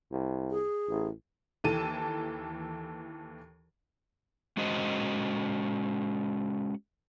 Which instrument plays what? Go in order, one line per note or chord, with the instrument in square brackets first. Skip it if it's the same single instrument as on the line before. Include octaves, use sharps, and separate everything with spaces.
[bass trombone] C2
[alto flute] G#4
[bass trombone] A1
[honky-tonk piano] D#2 E3 A4 A5 D#7
[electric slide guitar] G#3 C#4 F#4 C5 D#5